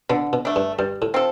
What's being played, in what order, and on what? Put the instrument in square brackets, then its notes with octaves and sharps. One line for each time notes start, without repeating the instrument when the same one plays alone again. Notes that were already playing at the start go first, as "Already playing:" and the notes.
[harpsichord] B2 [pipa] D3
[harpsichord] B2
[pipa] A3 D4
[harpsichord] G2
[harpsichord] G2 [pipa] G3
[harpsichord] A2
[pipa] C4 F4 A4